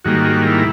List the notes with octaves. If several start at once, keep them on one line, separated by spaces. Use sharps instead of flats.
G#2 D#3 G3 A#3 F#4
E4